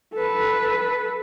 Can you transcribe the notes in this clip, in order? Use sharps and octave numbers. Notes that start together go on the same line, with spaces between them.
A4 B4